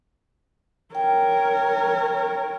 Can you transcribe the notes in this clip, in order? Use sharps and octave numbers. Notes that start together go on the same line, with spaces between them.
A#4 C#5 G5